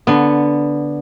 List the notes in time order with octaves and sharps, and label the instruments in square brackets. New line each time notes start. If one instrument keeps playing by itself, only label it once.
[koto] D3 B3